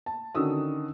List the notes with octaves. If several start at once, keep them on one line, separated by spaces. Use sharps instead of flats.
A5
D3 D#3 C#4 F#4 D#6 E6